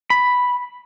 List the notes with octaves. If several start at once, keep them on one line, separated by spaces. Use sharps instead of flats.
B5